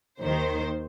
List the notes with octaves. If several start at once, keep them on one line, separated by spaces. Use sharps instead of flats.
D#2 D#3 C5